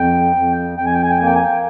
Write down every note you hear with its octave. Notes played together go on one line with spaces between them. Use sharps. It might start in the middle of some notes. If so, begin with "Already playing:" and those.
Already playing: F2 G5
F2
F2 G5
G#5
G5
G#5
G5
A#3 G#5
G5
G#5
G5